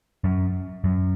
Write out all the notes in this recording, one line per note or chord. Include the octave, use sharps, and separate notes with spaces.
F#2
F#2